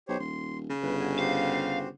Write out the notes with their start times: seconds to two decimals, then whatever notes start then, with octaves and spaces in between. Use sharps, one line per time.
0.08 B1 G4 C5 C#5
0.20 D#1 C6
0.70 C#3
0.83 G1 B4
1.00 F#4 G#5
1.19 F#4 G4 C5 F5